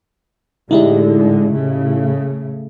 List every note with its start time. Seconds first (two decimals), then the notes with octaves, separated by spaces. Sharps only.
0.71 A2 D3 G#3 D#4 E4 G4
1.52 A2 C#3 A3